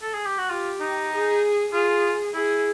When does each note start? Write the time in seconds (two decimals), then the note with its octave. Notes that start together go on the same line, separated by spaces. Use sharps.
0.02 A4
0.14 G#4
0.26 G4
0.38 F#4
0.49 F4 G4
0.81 D#4
1.12 G#4
1.73 F4 G#4
2.34 E4 G#4